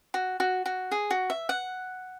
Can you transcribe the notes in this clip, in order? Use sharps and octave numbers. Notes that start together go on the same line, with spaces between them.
F#4
F#4
F#4
G#4
F#4
E5
F#5